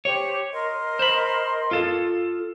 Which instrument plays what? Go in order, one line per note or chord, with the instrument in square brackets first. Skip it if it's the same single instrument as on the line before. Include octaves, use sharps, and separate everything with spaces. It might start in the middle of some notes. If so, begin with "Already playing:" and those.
[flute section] G4 C5 [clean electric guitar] C#5
[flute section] A#4 D#5 C6
[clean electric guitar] C5 B5
F4 A4